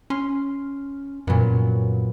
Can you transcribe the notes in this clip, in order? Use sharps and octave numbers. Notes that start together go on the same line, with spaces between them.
C#4 C6 F6
F#2 A#2 F#3 B3